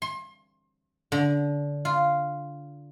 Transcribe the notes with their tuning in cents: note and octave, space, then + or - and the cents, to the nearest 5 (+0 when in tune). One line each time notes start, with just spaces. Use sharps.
C6 +35
D3 -20
F4 -5